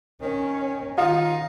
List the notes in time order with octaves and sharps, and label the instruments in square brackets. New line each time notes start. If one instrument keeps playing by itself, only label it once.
[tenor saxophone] D#3 [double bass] C#4
[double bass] D#3 [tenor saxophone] D#4 [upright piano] F4